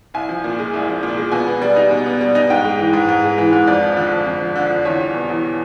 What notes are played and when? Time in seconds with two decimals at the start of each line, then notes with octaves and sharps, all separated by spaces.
0.14 C2 G#5
0.29 F3
0.44 A#2
0.59 G#3
0.74 C2
0.88 F3
1.03 A#2
1.17 G#3
1.32 B2 G#5
1.47 B3
1.62 G3
1.76 D#4
1.91 B2
2.06 B3
2.21 G3
2.35 D#4
2.50 G#2 G5
2.64 G#3
2.79 E3
2.93 G#2
3.09 G#2
3.23 G#3
3.38 E3
3.53 G#2
3.67 F2 D5
3.82 F3
3.97 D3
4.12 F2
4.26 F2
4.41 F3
4.56 D3
4.71 F2
4.85 E2 C#5
5.00 G3
5.14 B2
5.29 E2